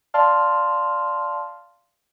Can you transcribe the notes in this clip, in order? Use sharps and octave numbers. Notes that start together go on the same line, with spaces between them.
D5 F5 A5 C6 F6